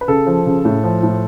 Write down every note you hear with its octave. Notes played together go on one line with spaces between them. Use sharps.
B4
C#3 A4
F3
C#3
A2
F3
A2